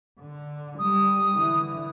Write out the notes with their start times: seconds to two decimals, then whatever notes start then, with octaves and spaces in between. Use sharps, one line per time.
0.20 D3
0.79 G3 D#6
1.33 D3 E3